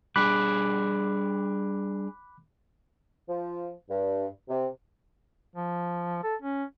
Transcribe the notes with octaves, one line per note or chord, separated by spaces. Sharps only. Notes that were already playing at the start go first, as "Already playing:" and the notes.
G3 D4 G#4 B5 D6 F#6
F3
G2
C3
F3
A4
C#4